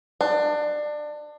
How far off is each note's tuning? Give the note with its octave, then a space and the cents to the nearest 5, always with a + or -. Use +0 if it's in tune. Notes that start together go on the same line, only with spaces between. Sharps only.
D4 +25